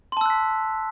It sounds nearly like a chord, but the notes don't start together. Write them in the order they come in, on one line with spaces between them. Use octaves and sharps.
C6 A5 E6 F#6 B6